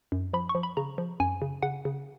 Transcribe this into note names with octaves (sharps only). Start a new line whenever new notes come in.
F#2
F3 B5
C#6
F3
B5
C#3 A#5
F3
F#2 G#5
C#3
C#3 F#5
C#3